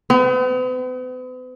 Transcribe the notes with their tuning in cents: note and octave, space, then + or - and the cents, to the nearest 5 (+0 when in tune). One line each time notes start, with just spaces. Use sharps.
B3 +45